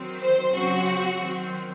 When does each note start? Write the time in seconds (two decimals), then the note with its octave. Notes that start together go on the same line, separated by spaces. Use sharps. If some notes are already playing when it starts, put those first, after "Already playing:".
Already playing: D#3 F#3 C4
0.21 C5
0.53 C#3 F#3 C4 F#4
1.18 D#3 F#3 C4